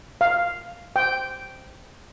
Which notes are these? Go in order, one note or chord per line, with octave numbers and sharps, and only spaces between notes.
F5
G5